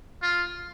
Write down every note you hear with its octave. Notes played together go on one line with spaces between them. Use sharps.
F4